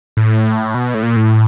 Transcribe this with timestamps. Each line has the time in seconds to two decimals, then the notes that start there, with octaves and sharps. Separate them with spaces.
0.17 A2
0.74 B2
0.94 A2
1.03 A#2
1.17 A2